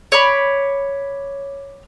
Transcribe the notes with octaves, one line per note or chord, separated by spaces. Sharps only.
C#5 D5 B5